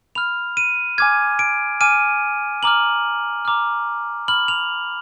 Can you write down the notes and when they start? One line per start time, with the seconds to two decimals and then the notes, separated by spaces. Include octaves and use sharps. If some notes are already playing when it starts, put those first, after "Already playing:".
0.15 B5 F6 F7
0.57 D#7
0.98 G#5 D6 F6 G#6
1.39 D7
1.81 G#5 D6 F6 D#7
2.63 A#5 D6 F6 F#7
3.45 A#5 D6 F6
4.28 B5 F6 F#7
4.48 F7